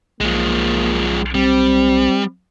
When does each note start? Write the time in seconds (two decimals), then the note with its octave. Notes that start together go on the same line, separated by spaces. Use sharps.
0.21 B1 F3 G#3 A#3
1.35 G3 C4